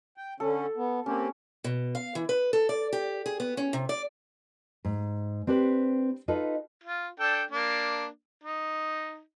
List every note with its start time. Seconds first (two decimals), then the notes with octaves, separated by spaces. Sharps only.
0.18 G5
0.40 D3 C#4 A4
0.77 B3
1.06 A#3 C4 C#4 G4
1.64 B2
1.95 F5
2.15 E3
2.29 B4
2.53 A4
2.69 D5
2.93 G4
3.26 G#4
3.40 B3
3.57 C#4
3.73 C3
3.89 D5
4.85 G#2
5.47 C4 D4 G4 B4 C5
6.28 D#4 F4 A4 B4 D#5
6.83 F4
7.19 D4 A4 G5
7.50 A#3 D4
8.43 D#4